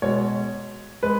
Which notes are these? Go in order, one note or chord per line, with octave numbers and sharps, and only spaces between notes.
B2 G#3 C#5
G#3 B4